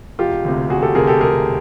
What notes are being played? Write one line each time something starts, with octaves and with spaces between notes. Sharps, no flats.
E1 F4 G4
D2 C3
E1 F#4 G#4
G4 A4
D2 C3 G#4 A#4
G4 A4
E1 G#4 A#4